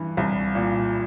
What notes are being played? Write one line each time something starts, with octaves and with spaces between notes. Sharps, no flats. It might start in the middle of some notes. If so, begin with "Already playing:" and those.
Already playing: G2 E3
C2
A#2